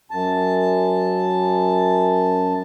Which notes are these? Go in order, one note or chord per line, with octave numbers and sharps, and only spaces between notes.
F#2 A5